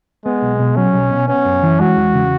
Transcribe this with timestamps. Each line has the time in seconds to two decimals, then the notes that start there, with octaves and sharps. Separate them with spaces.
0.25 G#3 B3
0.42 B1
0.59 B2
0.76 F#3 C#4
0.94 B1
1.11 B2
1.28 B3 C#4
1.45 F#2
1.63 E3
1.79 G#3 F#4
1.96 E2
2.14 C#3